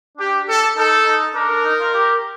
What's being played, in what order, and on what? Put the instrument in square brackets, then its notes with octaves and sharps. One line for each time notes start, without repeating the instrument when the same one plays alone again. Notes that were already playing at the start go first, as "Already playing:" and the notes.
[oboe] D4 [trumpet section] G4
[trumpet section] A4
[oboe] D#4 [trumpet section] A4
[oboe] D#4
[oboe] D4 [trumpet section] A#4
[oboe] D4
D#4
F4
G4